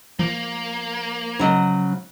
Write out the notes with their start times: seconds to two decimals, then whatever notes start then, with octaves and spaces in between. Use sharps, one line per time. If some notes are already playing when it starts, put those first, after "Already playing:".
0.19 F3 A#3
1.39 C#3 F#3 D#5